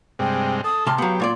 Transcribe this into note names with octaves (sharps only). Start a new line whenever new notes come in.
G2 C3 G#3 G5
A4 D#6
C3 A5 C6 F6
F#3 B3 G4 F5
A#2 C#5 D5 C6